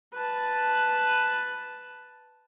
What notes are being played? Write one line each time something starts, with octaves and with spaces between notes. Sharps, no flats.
B4 A5